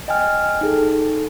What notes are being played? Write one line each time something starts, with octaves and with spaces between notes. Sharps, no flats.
D#5 G5 G#5 F6
D#4 G#4 A4